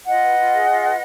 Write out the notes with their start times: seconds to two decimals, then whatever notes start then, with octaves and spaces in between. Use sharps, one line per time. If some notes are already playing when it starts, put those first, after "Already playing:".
0.06 F4 D#5 F#5
0.21 B4
0.37 F4
0.53 G#4
0.68 F4
0.83 B4